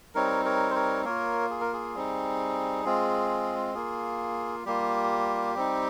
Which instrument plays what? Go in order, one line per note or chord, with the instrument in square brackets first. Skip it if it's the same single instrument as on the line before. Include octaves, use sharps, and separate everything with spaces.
[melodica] G3 C4 D#4 A#4 C#5
A#4 C#5
C5
A#4 C#5
A#3 F4 A#4 C#5
G#4
A#4
G#4
G3 C4 D#4
G#3 C4 F4
A#3 F4 G#4
G3 A#3 F4 G4
G3 C4 D#4